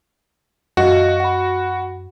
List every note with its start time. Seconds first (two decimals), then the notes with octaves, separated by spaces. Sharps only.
0.77 F#2 F#4 D#5 F5
1.20 F#5 B5